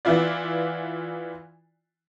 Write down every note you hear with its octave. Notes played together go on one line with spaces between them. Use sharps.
E3 B3 E4 F4 D5